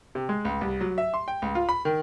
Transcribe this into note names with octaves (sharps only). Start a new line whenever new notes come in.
C3
G#3
C#2
C2
F#3
E5
C6
G5
C#2
F4
B5
D#3